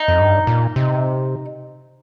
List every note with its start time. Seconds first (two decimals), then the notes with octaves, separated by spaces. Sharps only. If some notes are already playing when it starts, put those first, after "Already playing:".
Already playing: D#4
0.08 F2
0.20 G2
0.47 A#2
0.76 C3